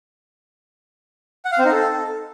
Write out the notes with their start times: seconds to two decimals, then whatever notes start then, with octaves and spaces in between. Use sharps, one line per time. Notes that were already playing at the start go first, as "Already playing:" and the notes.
1.45 F#5
1.52 F5
1.58 C4
1.65 D#4
1.72 A4